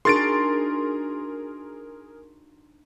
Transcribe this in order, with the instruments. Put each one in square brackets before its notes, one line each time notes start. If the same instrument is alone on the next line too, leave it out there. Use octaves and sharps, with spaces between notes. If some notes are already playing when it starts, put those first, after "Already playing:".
[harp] D4 D#4 F#4 [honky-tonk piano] G#4 A#4 [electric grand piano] C6 A6 D7